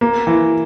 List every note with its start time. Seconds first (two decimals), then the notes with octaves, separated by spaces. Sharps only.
0.01 A#3
0.27 E3